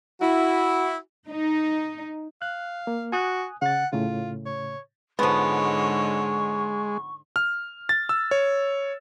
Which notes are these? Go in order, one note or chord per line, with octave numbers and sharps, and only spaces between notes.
E4 F#4
D#4
F5 F#6
A#3
F#4 G#5 D#6 F#6
C#3 F#5 A6
A2 C#3 F4
C#5
G#2 D3 F3 G#3 B3 C#5 C#6
F6
A6
E6
C#5